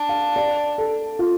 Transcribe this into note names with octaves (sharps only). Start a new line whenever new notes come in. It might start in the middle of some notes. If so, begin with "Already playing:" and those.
Already playing: D4
F5
D5
A4
F4